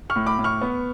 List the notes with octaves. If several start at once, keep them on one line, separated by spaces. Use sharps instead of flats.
C#6 F6
A2
B5 D6
A2
C#6 F6
B3